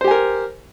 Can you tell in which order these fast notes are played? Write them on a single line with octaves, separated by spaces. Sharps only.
C5 G4 G#5 A#4